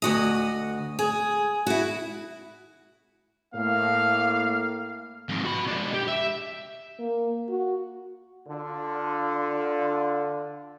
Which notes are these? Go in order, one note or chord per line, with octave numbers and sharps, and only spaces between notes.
D2 F#4 D#5
G#4
E4 F#4
A2 A#3 F5
F2 G#2
F#4 B5
G#3 D4
G4
E5
A#3
F#4
D3 F4